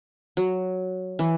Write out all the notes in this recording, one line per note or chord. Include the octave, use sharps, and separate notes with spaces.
F#3
E3